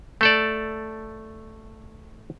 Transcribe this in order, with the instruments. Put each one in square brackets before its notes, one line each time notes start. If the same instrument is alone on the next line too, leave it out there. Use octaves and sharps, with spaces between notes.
[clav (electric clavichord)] A3 A4 D5